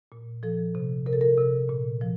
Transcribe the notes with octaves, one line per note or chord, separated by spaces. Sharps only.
A#2
F3 A4
C3
C3 A#4
A4
A#4
C3
A#2
F3